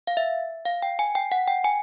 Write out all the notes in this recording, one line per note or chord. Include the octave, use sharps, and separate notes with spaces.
F5
E5
F5
G5
G#5
G5
F#5
G5
G#5